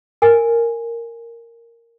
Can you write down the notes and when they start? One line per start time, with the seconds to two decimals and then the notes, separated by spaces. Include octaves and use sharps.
0.22 A#4 G#5